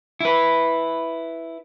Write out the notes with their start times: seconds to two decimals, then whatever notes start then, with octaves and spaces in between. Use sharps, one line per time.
0.20 E4 B4